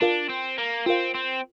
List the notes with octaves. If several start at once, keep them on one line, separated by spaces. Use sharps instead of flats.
D4 F4 A#4 F5
C4
A#3
C4 F4 A#4 F5
C4